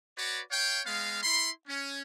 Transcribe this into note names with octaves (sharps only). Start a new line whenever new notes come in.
F#4 B4 C#5 D5
C#5 F5 G5
G#3 B3 F5
E4 B5 C6
C#4